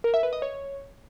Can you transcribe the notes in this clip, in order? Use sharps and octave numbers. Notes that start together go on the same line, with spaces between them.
A#4
E5
B4
D#5
C#5